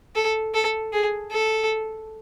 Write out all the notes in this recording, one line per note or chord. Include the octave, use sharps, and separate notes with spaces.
A4
A4
G#4
A4